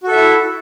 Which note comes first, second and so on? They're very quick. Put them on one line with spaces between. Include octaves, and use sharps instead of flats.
F#4 A4 E5 E4